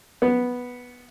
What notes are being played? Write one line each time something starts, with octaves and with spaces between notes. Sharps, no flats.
B3